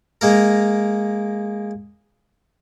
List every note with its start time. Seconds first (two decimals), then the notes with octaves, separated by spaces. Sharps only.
0.21 G#3 A#3 A#4